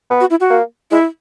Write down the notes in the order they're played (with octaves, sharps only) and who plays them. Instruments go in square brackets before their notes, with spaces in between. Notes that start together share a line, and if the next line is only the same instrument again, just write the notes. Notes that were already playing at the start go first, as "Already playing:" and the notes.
[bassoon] B3
[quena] F#4
E4
F#4
[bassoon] A#3
[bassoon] G#3 [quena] E4